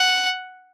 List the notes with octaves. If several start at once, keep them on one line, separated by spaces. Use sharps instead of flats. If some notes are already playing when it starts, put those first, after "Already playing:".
Already playing: F#5